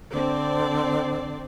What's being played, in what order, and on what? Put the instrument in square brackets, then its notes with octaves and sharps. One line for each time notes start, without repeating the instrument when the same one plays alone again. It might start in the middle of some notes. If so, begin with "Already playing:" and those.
[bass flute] D3 [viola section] C4 D5